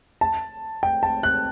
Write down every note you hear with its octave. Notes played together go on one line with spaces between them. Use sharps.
A5
G5
A5
F#6